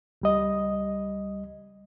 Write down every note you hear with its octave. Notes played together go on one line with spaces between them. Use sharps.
C#2 G3 D#5